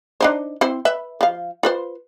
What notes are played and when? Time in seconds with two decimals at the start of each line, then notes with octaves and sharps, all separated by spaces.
0.21 D4 D#4 C5
0.61 C4 E4 C5
0.85 B4 E5
1.21 F3 F5
1.63 F4 B4 C5